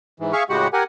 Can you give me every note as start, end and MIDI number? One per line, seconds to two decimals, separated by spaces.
0.20 0.32 44
0.20 0.32 52
0.33 0.43 68
0.33 0.43 76
0.33 0.43 77
0.33 0.43 85
0.49 0.68 45
0.49 0.68 49
0.49 0.68 56
0.49 0.68 66
0.49 0.68 67
0.49 0.68 78
0.73 0.84 67
0.73 0.84 70
0.73 0.84 78
0.73 0.84 80